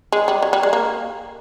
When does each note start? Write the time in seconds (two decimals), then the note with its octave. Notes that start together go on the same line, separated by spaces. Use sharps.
0.12 G#3
0.28 G3
0.42 F#3
0.53 G3
0.63 G#3
0.73 A#3